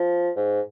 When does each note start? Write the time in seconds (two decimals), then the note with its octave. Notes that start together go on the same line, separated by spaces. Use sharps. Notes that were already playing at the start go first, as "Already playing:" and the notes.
Already playing: F3
0.36 G#2